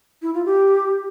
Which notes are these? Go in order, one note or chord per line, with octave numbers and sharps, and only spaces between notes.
E4
F4
G4